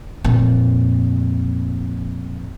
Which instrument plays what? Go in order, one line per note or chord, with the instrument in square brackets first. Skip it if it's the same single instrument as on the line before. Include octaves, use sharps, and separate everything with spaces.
[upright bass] F2 A#2